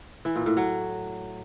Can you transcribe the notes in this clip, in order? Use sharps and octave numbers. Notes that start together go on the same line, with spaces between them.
E3
A#2
A2
F#3